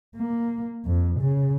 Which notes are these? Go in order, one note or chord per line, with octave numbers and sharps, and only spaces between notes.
A#3
F2
C#3